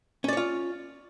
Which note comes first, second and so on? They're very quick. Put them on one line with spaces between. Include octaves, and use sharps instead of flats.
C#4 D5 C#5 F4